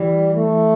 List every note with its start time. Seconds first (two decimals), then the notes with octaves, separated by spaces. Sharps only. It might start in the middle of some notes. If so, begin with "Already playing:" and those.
Already playing: E3 G3
0.35 A3